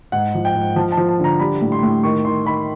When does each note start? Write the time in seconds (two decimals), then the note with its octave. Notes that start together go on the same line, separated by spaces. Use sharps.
0.12 G#2 F#5
0.35 F3
0.45 G5
0.55 G#2
0.76 F3 A5
0.92 A5
0.97 F3
1.09 A5
1.19 D3 A#5
1.40 G3 B5
1.61 A2
1.72 C6
1.83 A2
2.03 D#3 C#6
2.25 D#3 C6
2.46 D#3 B5